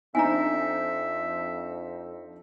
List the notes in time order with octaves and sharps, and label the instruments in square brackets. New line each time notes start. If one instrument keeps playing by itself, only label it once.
[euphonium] F2 [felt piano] C4 D4 D#4 [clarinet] E5 [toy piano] G#5 A#5